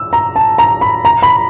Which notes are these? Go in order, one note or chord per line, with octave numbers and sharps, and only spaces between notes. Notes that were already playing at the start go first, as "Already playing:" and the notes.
Already playing: E6
A#5
A5
A#5
B5
A#5
B5